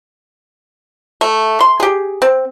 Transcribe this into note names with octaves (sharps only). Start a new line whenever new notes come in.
A3
C6
G4 G#4
C4